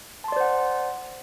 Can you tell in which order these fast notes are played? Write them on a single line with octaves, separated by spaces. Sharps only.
A5 C6 D5 C5 F#5